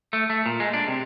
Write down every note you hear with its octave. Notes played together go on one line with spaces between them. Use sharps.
A3
A3
A#2
G#3
D4
C3